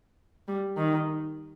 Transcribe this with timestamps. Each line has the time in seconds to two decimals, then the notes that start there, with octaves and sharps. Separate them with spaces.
0.48 G3
0.78 D#3